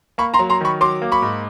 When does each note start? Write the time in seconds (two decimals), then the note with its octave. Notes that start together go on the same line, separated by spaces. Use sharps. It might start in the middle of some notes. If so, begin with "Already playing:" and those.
0.18 A#3 B5 C#6
0.34 A#5 C6
0.39 F#3
0.50 A#5 C6
0.61 D#3 B5 C#6
0.81 F#3 C6 D6
1.02 A#3
1.12 B5 C#6
1.22 G#2